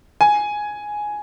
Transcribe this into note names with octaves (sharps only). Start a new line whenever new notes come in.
G#5